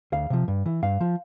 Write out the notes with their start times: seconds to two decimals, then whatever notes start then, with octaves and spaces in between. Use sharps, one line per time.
0.12 D2 F5
0.30 C3 F3
0.48 G2
0.66 E3
0.82 G2 F5
1.01 F3